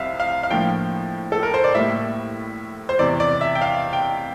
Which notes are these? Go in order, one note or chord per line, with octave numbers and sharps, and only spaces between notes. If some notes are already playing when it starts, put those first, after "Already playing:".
Already playing: C2 C3 G3 C4 E5 F5
F5
F5
A2 F3 A#3 D4 G5
A4
A#4
C5
D5
A2 G3 A#3 E5
C5
E2 C3 E3 D5
D5
E5
G5
F5
G5